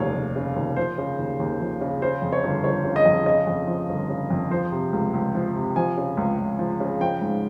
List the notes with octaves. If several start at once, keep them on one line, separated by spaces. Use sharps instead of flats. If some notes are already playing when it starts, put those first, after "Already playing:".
Already playing: F1 D#2 C#3 C#5 F5
F1
C#3
D#2
F3 C5
C#3
D#2
D#2
F3
C#3
C#3 C5
F2
C#5
G1
G1 C#5
C#3
D#5
F2
C#3 D#5
F2
F3
G1
C#3
F2
F3 C5
C3
C#2
C#2
F3
C3
F3 G#5
C#3
C#2
C#2
F3
C#3
F3 G5
G#2